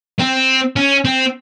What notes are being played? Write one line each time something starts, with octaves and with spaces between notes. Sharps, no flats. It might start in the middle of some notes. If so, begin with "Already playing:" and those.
C4
C#4
C4